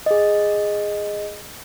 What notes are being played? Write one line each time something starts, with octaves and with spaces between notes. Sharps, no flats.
G#4 D#5